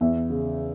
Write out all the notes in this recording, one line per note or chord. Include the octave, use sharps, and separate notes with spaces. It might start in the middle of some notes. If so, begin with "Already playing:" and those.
E2 E5
C#3